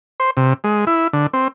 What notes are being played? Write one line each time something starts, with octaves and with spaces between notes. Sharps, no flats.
C5
C3
G#3
E4
D3
C4